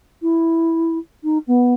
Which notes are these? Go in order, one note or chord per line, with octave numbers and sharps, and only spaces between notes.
E4
D#4
B3